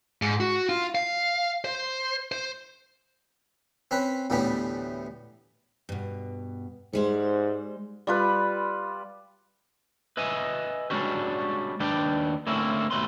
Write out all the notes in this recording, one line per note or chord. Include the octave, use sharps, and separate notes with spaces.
G#2
F#4
F4
F5
C5
C5
C4 C#4 B4
D2 A2 E3 G3 B3 C#4
G2 B2
G#2 G3 G#3 C5
G3 F4 B4
B4 D#5 E5 G#5
G3 G#3 C#4 D4 F#4 G4
D#2 D4 B4 D5 G5
D3 A3 A#3 C4 C#4 E4
D#2 B2 A3 B4 C6